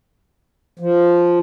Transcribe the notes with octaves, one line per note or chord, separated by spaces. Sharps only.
F3